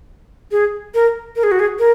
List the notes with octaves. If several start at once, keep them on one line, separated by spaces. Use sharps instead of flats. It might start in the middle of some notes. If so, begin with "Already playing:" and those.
G#4
A#4
A#4
G#4
F#4
G#4
A#4